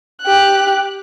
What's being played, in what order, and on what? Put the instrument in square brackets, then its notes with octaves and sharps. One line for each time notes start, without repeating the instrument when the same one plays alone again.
[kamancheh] G4 F#6